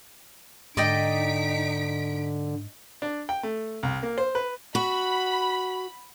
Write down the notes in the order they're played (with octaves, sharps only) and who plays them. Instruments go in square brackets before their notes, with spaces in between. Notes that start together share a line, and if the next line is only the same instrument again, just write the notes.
[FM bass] G#2 [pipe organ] D3 [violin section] D#4 B6 D7 [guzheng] D5 D#5 G5
[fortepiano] D4
G5
A3
C2
A#3
C5
B4
[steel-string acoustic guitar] F#4 [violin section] B5